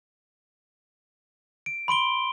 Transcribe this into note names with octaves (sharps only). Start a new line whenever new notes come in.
D7
B5 C6 D7 G7